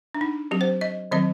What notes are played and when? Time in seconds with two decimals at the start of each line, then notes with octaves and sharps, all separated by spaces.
0.14 D4
0.21 D#4
0.51 F#3 C4 G4
0.61 C5
0.81 D#5
1.11 D#3 F#3 C4 D#5